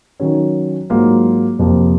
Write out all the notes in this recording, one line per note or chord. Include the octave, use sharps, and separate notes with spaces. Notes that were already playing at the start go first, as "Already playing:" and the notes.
D#3 F#3 C#4
G#2 F#3 A#3 F4
F2 C3 F3 A#3